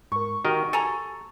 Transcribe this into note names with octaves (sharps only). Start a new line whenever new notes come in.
G#2 A#4 C#6
D#3 F#4 G4 A#4 D#5
A4 G#5 A#5